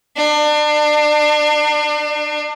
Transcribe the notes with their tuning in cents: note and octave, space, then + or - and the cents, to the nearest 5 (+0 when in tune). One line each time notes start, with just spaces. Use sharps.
D4 +35